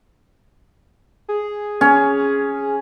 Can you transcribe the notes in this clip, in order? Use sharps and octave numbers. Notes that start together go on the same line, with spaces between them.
G#4
C#4